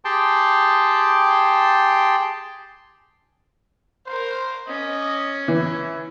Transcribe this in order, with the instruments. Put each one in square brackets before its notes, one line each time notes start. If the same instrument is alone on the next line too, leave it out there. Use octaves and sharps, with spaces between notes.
[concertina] G4 G#4 G5 A5 C6
[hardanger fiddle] A#4 F5 [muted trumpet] C5
[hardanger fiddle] C#4 [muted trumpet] D#5
[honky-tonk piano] E3 [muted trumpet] E4